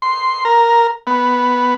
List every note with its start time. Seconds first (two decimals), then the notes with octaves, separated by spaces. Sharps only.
0.02 C6
0.45 A#4
1.07 B3